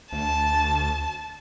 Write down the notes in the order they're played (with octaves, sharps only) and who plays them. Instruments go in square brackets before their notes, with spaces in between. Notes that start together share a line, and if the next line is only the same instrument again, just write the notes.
[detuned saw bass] D2 [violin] A5